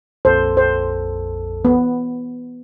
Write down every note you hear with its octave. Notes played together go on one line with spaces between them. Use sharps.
A#1 F2 A4 C5
C5
B3